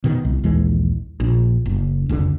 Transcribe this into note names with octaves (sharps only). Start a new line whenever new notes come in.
B2 D#3
C2
A#1 D#2 E3 G#3
A#1
F#1
F1 C#2 D3